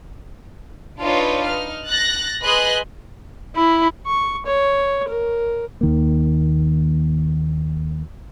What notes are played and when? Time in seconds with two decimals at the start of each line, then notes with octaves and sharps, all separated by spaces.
1.01 D4 D#4 F4 B4 C#5
1.46 D#4 F6
1.87 F#6 A6 A#6
2.43 G#4 B4 D#5 B5 C6 F#6
3.56 E4 B5
4.06 C#6
4.46 C#5
5.08 A#4
5.81 D#2 D#3 A#3